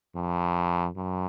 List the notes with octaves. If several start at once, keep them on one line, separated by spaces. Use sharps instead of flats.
F2
F#2